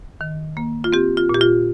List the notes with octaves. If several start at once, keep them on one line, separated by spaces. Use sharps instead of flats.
D#3
A#3
F4
C4 G4
F4
A#2 G4
F4